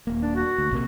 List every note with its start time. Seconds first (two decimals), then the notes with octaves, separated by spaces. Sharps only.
0.07 D#1 A#3
0.22 D4
0.35 F#4
0.58 D2
0.71 A#1 C3 A#3